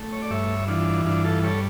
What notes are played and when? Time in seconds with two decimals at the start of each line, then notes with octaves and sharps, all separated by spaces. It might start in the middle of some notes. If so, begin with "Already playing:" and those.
Already playing: A3
0.12 C#5
0.22 D5
0.31 G2 C#5 E5
0.68 E3 D4 F4
1.05 G2 D4 F4
1.24 F4 A4
1.43 G3 A4 C#5